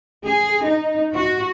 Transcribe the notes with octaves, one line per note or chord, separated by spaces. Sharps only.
G#4
D#4
F#4